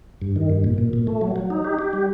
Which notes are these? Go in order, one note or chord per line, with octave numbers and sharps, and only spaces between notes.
G2
D#3
G2
A#2
A#2
A#2
A3
F#3
F#3
D#4
G4
G4
G3